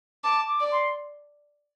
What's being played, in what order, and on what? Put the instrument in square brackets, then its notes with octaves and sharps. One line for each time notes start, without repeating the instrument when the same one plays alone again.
[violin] A5 [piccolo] D6
[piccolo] D6
[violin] D5
[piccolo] C6